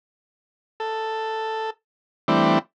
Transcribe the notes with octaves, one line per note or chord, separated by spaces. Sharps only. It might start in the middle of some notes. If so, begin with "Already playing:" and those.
A4
E3 G3 A3 C4 D4 E4